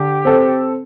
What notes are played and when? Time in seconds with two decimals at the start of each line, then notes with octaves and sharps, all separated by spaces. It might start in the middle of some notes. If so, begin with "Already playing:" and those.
Already playing: D3 G4
0.25 C4 A4 C5